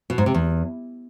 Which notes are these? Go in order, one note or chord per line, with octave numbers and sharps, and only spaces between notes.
B2
G#2
C3
E2